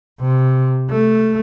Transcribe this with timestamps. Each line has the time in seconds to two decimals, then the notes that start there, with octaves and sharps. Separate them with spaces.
0.21 C3
0.90 A3